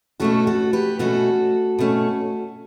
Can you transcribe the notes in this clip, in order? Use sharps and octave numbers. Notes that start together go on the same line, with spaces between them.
B2 A3 C#4 F#4 A4
F#4 A4
G4 B4
B2 A3 C#4 F#4 A4
B2 A3 C#4